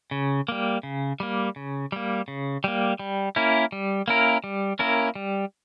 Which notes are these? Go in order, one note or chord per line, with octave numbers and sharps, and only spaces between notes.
C#3
G3 A#3
C#3
G3 A#3
C#3
G3 A#3
C#3
G3 A#3
G3
A#3 C#4 E4 A#4
G3
A#3 C#4 E4 A#4
G3
A#3 C#4 E4 A#4
G3